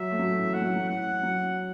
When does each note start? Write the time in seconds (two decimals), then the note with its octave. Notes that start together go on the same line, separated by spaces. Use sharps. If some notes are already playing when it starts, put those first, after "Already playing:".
Already playing: F#3 E5
0.11 A3
0.19 F#3
0.37 E3
0.53 A3 F#5
0.62 F#3
0.69 E3
0.75 F#3
0.89 F#5
1.23 F#3